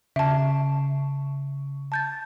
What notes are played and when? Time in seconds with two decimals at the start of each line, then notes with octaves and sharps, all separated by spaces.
0.16 C#3 E5 A5
1.92 A5 G6 A6